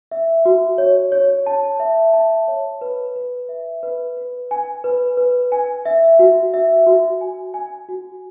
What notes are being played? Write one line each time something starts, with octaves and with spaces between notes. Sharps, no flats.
E5
F#4
C#5
C#5
A5
E5
A5
C#5
B4
B4
E5
B4
B4
G#5
B4
B4
G#5
E5
F#4
E5
F#4
G#5
G#5
F#4